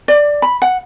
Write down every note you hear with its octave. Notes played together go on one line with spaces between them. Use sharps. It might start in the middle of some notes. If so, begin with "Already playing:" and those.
D5
B5
F#5